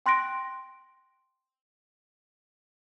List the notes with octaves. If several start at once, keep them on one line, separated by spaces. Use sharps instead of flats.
G5 C6 F#6 A#6 D7